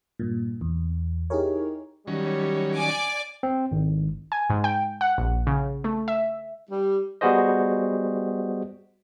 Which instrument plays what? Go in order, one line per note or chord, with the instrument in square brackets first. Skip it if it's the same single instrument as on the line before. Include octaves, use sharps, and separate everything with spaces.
[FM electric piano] G2 A#2
E2
D#4 E4 G4 G#4 A#4 C#5
[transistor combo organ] D#3 F#3 C#4 [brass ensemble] G3 C#5
[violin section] D5 G#5 D6
[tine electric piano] C4
G#1
[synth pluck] G#5
G#2
G5
F#5
A#1
C#3
A3
E5
[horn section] G3
[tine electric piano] G3 B3 F#4 G#4 C5 D#5